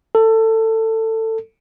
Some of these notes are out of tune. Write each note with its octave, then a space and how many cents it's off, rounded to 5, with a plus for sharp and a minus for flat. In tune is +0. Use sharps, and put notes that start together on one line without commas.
A4 +20